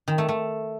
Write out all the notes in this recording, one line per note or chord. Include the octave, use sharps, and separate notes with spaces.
D#3
A3
A3